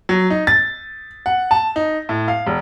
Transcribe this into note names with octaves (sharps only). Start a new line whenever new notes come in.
F#3
D#4
A6
F#5
A5
D#4
A2
F5
E1